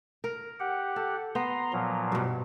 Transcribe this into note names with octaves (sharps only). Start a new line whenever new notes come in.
A#4
G4 F#5
A4
B3 A#5 C6
A#2 F3 F#3
G2 B2